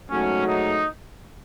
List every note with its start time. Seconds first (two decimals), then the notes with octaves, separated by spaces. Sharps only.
0.11 G#2 F#3 A3 C#4
0.47 D#4